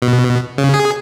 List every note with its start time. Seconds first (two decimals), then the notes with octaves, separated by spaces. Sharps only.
0.02 B2
0.58 C#3
0.74 G#4